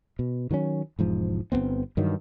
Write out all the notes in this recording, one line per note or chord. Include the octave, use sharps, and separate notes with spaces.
B2
D#3 F#3 A#3 C#4
E1 G#2 F3
G1 A2 B3 C4
G2 D#3 E3 F#3